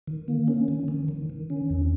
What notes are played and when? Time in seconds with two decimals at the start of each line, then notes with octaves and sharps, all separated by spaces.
0.07 D#3
0.28 A#3
0.48 C#4
0.68 D#3
0.88 D#3
1.08 D#3
1.30 D#3
1.50 C#4
1.70 E2